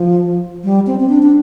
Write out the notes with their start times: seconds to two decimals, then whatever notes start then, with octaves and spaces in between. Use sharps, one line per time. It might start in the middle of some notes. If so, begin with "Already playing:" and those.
Already playing: F3
0.64 G3
0.87 C4
0.99 C4
1.09 D4
1.22 D4